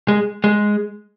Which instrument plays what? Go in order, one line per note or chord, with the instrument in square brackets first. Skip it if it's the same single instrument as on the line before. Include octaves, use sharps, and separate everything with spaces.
[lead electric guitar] G#3
G#3